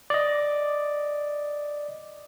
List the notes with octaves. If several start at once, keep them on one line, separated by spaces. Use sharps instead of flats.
D5 D#5